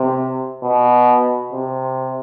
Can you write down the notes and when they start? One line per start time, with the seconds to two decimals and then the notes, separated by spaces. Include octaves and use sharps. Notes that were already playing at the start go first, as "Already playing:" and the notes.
Already playing: C3
0.63 B2
1.52 C3